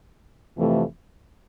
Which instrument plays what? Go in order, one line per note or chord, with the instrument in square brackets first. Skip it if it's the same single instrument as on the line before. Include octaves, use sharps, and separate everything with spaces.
[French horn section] F2 C3 E3 A3